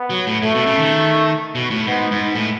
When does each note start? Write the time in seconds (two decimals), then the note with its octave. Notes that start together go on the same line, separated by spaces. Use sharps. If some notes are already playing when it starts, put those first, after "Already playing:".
Already playing: B3
0.10 F#3
0.26 A2
0.42 A2 A3
0.55 B2
0.66 C#3
0.78 D#3
1.55 B2
1.70 A2
1.87 G#2 B3
2.11 G#2
2.35 A2